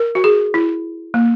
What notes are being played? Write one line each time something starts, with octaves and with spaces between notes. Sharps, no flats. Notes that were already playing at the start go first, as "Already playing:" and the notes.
Already playing: A#4
F#4
G#4
E4
A#3